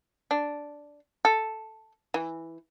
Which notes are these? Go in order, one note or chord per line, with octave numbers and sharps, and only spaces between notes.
D4
A4
E3